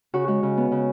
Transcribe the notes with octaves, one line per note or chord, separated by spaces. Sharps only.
C#3 F#4
G#3 F#4
C#3
B3
C#3